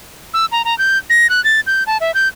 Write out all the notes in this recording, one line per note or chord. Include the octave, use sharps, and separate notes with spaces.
E6
A#5
A#5
G6
A#6
F#6
A6
G6
A5
E5
G6